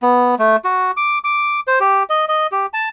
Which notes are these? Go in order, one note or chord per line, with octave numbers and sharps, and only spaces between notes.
B3
A3
F#4
D6
D6
C5
G4
D#5
D#5
G4
A5